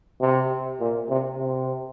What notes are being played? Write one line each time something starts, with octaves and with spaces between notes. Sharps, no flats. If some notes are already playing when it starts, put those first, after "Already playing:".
C3
A#2
C3
C3